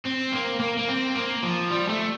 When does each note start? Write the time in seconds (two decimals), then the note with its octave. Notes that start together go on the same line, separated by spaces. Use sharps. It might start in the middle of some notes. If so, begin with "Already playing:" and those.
0.05 C4
0.32 A#3
0.60 A#3
0.77 A#3
0.88 C4
1.15 A#3
1.43 F3
1.71 G3
1.89 A3